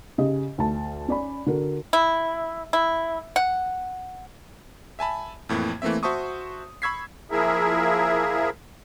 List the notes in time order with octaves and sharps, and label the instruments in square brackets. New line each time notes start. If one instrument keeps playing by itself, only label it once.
[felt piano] C#3 G4 D#5
D2 A5
C#4 D5 B5
D3 F#4 A#4
[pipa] E4
E4
F#5
[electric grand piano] E5 G#5 A5 B5
F2 A2 E3 A#3 G#6
E3 A3 A#3 C4 E5
F#4 C5 E5 A5 C#6 D#6
B5 C#6 E6 G#6 B6 C7
[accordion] F3 A#3 E4 G#4 A#4 E5